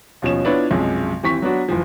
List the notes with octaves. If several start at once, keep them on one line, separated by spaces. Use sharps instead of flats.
D#2 B2 F3 C#4 E7
B3 D4 E4 F4 B4 C#5
B1 F#2 C3 F3 G#3
D#1 E3 C4 C#6 B6
F#3 B3 D4 F#4
F#1 E3 F3